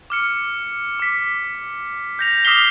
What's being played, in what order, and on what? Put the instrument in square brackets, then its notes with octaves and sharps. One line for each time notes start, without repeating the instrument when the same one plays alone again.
[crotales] D6 F6 C#7
D6 B6
G6 A#6 F7
D6 D#6 F6 B6 C7 G7